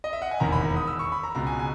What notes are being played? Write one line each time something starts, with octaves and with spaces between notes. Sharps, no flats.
D#5
E5
F#5
G#5
E1 D#2 D#3 A#5
B5
D#6
E6
C#6
B5
A#5
C#2 B2 A#5
G#5
G#5